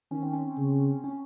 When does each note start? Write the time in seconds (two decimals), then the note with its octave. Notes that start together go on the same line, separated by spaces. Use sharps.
0.11 D#3 C#4
0.23 C4
0.33 C#4
0.58 C#3
1.04 C#4